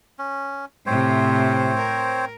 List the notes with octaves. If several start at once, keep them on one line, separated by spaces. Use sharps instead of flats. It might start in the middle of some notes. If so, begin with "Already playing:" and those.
C#4
A2 C3 C4 C5 C#5
A#4